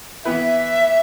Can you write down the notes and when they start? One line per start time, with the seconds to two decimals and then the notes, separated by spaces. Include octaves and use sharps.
0.24 E3 B3 E4 B4 E5